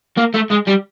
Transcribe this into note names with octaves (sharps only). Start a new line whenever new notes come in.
A#3
A3
G#3
G3